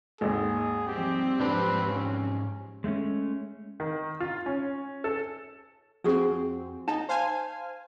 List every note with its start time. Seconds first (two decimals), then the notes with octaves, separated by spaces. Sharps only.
0.21 G#1 D#2 G#4
0.88 F3 G3 C4 G4
1.40 G#2 D4 G4 B4 A5
1.88 C#4
2.84 G#3 A3 C4 C#4
3.80 D#3
4.20 F4
4.46 C#4
5.04 A4
6.04 F2 C4 F#4 G#4
6.88 D#4 A5
7.09 C5 F5 G#5